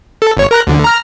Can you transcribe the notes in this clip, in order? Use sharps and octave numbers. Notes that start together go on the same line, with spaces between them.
A4
G1 C#5
A#4 A#5 F#6
D2 D3
A#5 F6